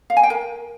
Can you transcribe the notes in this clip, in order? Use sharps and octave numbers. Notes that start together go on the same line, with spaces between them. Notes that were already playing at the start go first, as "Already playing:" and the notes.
F5
G#5
G5
A#4